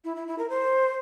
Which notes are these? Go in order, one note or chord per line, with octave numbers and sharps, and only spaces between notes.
E4
E4
E4
A#4
C5